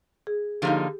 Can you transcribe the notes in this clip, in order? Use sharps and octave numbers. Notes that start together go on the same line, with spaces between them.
G#4
D3 F3 A#3 D#4 G4